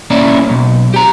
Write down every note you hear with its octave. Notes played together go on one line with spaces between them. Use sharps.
A#3 C#4 E4 D5
B1
G4 A#5